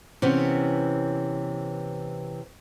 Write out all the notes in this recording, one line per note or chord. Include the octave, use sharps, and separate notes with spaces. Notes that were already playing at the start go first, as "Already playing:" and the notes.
C3 E3 B3 C#4